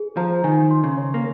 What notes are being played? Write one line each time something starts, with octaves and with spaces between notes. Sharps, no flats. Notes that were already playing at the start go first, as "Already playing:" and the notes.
Already playing: G#4
F3 A#5
D#3 G#5
C6
C#3
C#5
A#3